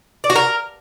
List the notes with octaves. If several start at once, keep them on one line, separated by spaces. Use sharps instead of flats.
D5
F#4
A#4